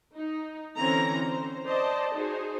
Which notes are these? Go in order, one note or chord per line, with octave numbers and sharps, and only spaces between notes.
D#4
D3 E3 C4 C#4 E4 A#5
C5
C5 D5 D#5 A5
D#4 F#4 G#4 C5